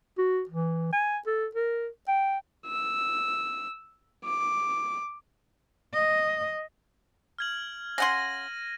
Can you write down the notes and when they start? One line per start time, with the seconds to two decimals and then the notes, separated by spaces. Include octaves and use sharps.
0.18 F#4
0.49 E3
0.92 G#5
1.27 A4
1.55 A#4
2.08 G5
2.67 E6
4.25 D6
5.93 D#5
7.39 F6 G#6 F#7
7.98 C#3 F#5 C6 A#6 D#7